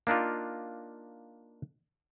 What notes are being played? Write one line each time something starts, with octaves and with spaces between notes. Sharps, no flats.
A#3 D4 D#4 F4